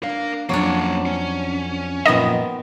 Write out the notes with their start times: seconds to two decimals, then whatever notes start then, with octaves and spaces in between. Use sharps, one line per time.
0.03 D4 A#4 F5
0.49 F2 F3 F#3 A#3 C#4 D4
1.06 C#4
2.06 F#2 A#2 D#3 F3 B3 D#5